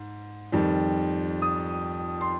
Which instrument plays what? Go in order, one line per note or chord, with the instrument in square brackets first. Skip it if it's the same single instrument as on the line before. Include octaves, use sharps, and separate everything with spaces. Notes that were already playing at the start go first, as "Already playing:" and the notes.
Already playing: [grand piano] G#2
F2 D#3 G3
D#6
C6